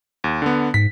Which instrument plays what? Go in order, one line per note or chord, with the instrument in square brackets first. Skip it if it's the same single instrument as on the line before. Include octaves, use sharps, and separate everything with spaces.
[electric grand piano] D#2
D3 B3
[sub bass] G#2 [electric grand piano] B6